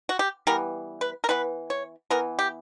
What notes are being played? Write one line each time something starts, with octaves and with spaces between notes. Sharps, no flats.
F#4
G4
E3 G3 B3 A#4
B4
A#4
E3 B3 B4
C#5
E3 B3 A#4
G4